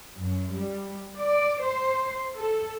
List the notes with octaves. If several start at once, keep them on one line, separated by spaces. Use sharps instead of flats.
F#2
G3
D5
C5
A4